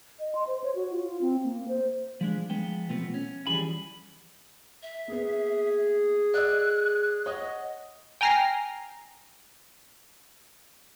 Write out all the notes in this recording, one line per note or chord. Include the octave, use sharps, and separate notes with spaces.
D#5
C6
C5
C#5
F#4
F4
F4
C4
A#3
C5
F3 G#3 D4
F3 G#3 B3 G5
B2 F3 A3 B3 C4
C#4
E3 F3 G3 G#4 G#5 B5
E5
A#3 B3 G#4
D5 D#5 E6 F#6
C#5 D#5 F#5 D#6
G5 G#5 A#5 F6 A#6 C7